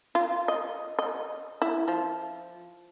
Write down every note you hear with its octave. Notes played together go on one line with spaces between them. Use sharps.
F4
D#5
D#5
E4
F3